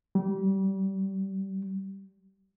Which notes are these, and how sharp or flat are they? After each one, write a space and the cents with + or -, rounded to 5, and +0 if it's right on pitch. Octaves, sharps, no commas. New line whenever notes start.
G3 -25